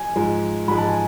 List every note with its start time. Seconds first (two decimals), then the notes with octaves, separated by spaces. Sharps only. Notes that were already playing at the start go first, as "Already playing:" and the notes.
Already playing: G#5
0.16 G#2 F3 G#3
0.68 G#2 F3 G#3 B5
0.78 A5
0.89 G#5